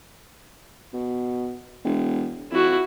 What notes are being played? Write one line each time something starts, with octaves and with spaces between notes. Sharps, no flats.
B2
E1
F2 E4 F#4